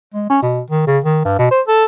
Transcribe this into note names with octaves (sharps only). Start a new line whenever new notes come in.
G#3
C#4
B2
D#3
C#3
D#3
G2
B2
C5
A4